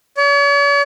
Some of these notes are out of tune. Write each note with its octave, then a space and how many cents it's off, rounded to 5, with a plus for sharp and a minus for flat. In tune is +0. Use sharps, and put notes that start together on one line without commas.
C#5 +45